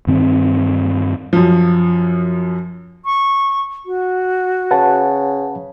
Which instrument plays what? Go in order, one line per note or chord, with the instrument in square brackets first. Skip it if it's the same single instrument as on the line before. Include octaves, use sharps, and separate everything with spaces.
[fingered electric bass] G2 D#3 C4
[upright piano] F#2 F3
[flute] C#6
F#4
[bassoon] C#3 [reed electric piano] B4 F#5 A5